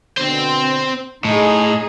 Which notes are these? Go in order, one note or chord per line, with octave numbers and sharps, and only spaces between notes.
B2 D3 C4 C5
A2 D#4 G#4 D#5